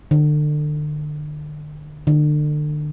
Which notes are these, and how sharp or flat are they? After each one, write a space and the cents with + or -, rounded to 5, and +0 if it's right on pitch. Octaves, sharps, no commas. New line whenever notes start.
D3 +35
D3 +35